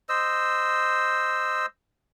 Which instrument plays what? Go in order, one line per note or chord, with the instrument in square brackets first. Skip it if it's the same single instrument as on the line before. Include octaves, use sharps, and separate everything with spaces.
[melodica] C5 D#5 E6